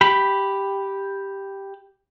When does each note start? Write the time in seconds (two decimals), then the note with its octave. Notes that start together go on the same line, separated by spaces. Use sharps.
0.01 G4 B5